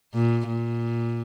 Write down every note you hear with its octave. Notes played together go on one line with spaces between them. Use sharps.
A#2
A#2